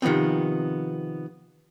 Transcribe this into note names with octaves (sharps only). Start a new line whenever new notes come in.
C3 D#3 F3 B3 C4